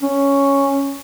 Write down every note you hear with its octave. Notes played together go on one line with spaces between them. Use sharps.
C#4